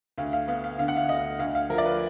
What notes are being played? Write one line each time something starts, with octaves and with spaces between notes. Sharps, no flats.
D2 F5
F5
B3 F5
F5
D3 F5
F#5
F5
D2 D#5
D2 F5
F5
F3 A#4
D5
B4